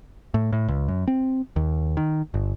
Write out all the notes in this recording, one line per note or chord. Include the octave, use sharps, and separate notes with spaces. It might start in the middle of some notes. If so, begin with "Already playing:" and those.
A2
A2
C#2
F#2
C4
D#2
D#3
G1